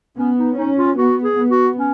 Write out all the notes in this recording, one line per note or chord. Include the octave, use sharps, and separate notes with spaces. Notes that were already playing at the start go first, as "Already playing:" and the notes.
B3 C#4
D#4
C#4 D#4
F4
B3 F#4
G#4
B3
F#4
C#4